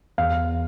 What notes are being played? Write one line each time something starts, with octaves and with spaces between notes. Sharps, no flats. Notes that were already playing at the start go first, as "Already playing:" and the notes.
E2 F5